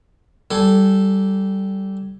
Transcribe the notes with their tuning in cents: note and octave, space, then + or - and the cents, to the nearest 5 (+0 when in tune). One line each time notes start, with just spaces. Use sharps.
G3 -20 A4 +0 G#5 +0